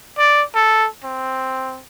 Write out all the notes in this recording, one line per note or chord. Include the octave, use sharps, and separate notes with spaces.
D5
A4
C4